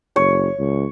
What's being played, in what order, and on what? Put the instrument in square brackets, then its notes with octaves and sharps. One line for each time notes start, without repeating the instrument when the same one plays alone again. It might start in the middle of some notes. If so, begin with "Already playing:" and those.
[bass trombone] F#1 [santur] C#5
[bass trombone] C#2